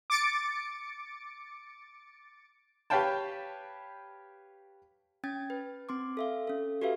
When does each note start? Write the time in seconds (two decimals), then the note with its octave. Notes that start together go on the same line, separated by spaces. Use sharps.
0.10 D6 A6 C#7 D7
2.90 G4 B4 C#5 F5 G5 A5
5.24 C#4 G5 G#6 A6
5.50 B4
5.89 C4 C6 D6
6.17 A4 E5 F5
6.47 C#4 A4
6.82 F#4 G4 A4 B4 E5 F5